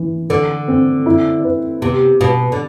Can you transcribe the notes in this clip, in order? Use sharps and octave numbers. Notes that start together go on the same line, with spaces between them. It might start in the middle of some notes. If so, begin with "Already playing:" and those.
Already playing: E3
D3 A4
C4
E4
B4
C3 B3
B2 F#4
D3